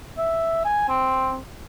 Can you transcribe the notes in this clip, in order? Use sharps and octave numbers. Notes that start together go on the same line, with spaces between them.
E5
G#5
C4